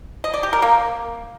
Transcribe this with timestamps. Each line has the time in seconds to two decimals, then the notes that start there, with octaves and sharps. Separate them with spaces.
0.24 D#5
0.34 D5
0.43 G4
0.53 A#4
0.62 A#3